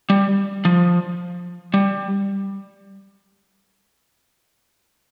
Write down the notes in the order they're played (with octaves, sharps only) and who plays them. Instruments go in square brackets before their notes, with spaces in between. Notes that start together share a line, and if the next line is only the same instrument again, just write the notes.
[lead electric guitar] G3
F3
G3